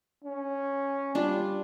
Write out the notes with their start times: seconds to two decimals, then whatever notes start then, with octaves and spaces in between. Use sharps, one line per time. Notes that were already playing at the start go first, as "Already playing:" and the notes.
0.24 C#4
1.15 G3 D4 F4